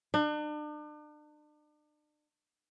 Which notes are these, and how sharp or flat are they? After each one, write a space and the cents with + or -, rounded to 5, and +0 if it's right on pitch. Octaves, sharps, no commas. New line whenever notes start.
D4 +40